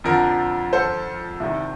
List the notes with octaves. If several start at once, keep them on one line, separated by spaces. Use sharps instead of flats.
F2 D3 F3 A#4
A4 C5
C2 C3 D#3